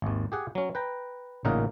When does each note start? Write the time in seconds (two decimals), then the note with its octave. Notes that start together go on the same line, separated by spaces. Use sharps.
0.02 G#1 D#2
0.32 G4 G#4 F#5
0.55 F#3 C#4
0.75 B4 G5 A#5
1.45 A1 A#2 C#3 D#4 A#4 F#5